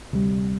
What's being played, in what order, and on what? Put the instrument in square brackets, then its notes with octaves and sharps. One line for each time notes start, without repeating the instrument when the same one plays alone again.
[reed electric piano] D2 C3 G3